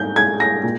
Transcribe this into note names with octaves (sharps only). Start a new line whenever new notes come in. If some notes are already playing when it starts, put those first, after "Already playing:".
Already playing: G#2 G6
G#3 G#6
A#6
A#2